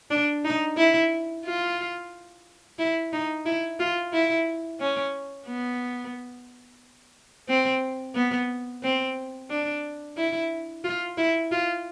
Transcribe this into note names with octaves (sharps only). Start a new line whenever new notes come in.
D4
D#4
E4
F4
E4
D#4
E4
F4
E4
C#4
B3
C4
B3
C4
D4
E4
F4
E4
F4